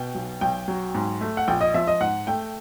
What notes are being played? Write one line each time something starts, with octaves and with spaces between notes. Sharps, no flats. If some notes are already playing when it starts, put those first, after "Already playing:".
Already playing: B2 G5
B1
B1 G5
F#3
G#2
A3
F#5
A#1 G5
D#5
F3 E5
D#5
G#2 F#5
A3 G5